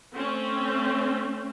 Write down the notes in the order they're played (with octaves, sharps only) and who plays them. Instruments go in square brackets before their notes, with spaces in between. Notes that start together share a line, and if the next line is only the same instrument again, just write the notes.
[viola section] A3 C4 C#4